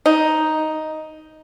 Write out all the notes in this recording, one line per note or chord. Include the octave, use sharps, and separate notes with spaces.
D#4